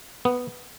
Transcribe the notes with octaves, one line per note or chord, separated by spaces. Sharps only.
B3